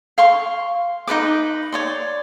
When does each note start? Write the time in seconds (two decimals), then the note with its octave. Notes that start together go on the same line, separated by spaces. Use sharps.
0.18 F5 C6 C#6
1.07 D#4 A#4 B4 D6
1.72 C#5 D5 C6